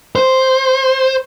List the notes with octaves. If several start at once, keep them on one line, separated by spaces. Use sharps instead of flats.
C5